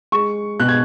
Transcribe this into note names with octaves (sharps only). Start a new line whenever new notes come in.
G#3 C#6
B2 F#6
G#6